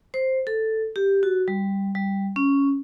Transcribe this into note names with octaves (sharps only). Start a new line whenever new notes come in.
C5
A4
G4
F#4
G3
G3
C#4